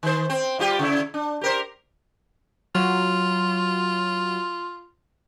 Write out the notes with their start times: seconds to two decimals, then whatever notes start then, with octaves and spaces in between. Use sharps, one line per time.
0.03 D#3 C5
0.30 C4
0.59 G3 F4 G4
0.79 C#3 E4
1.14 D4
1.41 G4 A#4 C5
2.75 F#3 F4